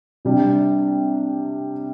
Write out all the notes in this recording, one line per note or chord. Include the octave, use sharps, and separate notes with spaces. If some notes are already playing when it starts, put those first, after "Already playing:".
C3 G3 D4